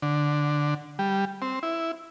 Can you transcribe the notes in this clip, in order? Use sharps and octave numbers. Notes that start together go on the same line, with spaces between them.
D3
G3
C4
E4